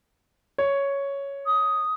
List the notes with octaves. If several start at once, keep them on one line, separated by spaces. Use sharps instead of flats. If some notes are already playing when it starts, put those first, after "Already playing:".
C#5
D#6